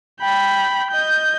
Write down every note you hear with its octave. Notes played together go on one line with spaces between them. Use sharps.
G5 B5
D#5 G6